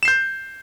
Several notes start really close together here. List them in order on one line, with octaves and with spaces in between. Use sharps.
E7 C7 G6